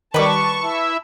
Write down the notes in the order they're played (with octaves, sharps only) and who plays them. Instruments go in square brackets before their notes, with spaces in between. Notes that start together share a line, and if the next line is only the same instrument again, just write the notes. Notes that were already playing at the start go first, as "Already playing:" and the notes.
[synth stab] D#3 G3 [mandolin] B4 D6 [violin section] A5 C#6
[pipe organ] E4 E5